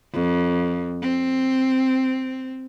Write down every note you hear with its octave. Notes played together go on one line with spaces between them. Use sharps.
F2
C4